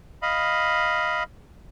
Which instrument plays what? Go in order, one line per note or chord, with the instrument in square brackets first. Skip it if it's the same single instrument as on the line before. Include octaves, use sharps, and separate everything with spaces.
[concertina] D#5 F5 B5